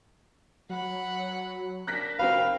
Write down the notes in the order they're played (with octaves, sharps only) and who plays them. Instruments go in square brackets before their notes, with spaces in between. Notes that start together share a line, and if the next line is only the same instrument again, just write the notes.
[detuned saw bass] F#3 [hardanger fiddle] F#5 B5
[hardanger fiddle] A#3 D4 [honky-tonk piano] F#6 A#6 B6
[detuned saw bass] F1 [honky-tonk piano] C4 F#4 B4 [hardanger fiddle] A#4 [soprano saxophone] F5